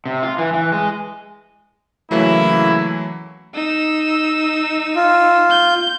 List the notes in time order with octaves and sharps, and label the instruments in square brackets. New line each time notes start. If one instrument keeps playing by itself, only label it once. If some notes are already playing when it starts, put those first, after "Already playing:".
[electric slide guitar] C3
F4
E3
E3
G#3
[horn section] C#3 A#3 E4 [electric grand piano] E3 F#3 A3
[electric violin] D#4 E6
[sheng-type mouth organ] F4
[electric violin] G6